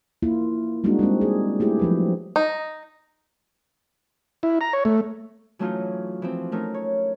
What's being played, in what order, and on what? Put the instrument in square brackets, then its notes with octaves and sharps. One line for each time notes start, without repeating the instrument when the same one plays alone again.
[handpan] A#3 E4 F4
G3 G#3 A#3 D4 D#4 F#4
G3 G#3 C4
G#4
A3 E4 G4 G#4
F3 F#3 B4
[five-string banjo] D#4
[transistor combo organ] E4
A#5
C#5
A3
[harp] E3 F#3 A3 C#4 D#4 F4
E3 F3 C4
A3 C#4 D#4 A#4
C#5